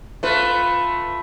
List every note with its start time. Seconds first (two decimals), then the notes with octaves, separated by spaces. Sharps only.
0.23 A3 F4 B4